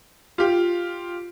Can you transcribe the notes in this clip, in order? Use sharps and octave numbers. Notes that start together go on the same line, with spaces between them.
F4 G4